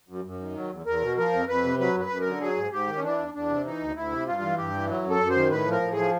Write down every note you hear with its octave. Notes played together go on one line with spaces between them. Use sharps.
F#2
F#2
D#3
F#3
E2
E2 A#4
B2
F3 A#4
F2
F2 B4
C3
F#3 B4
F#2 B4
F#2
A#4
D3
F#3 G#4
G#2
G#2 G4
D#3
C#4
E3 D4
E2
E2 D4
C3
E3 D#4
D2
D2 E4
C3
G2 F4
E3
G2 G4
E3
F#3
F#2
A4
F#2
C5
D#3
A2 B4
F3
A#4
A2
G#4
F3